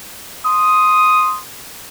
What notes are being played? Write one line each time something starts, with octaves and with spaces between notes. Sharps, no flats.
C6 D#6